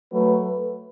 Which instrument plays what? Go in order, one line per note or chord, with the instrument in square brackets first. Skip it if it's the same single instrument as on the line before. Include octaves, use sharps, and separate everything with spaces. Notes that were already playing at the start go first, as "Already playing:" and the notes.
[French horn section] F#3 A3 F#4 B4